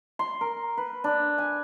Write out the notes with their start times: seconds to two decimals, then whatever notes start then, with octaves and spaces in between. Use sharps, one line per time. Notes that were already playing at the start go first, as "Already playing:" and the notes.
0.19 C6
0.41 A#4
0.77 B4
1.04 D4
1.38 G#5